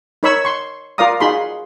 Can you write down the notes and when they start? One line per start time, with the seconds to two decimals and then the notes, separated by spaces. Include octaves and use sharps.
0.23 D#4 A#4 C#5 B5 C#6 E6
0.45 C6 C#6
0.98 F4 A#4 D5 F5 A#5 D#6
1.20 D#4 F4 F#4 G#4 B5 C6